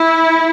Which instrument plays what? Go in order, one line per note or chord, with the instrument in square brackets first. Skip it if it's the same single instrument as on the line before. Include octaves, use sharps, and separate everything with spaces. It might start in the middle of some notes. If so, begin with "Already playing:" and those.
Already playing: [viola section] E4